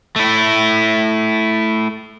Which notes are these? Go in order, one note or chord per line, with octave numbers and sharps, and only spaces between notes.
A3 E4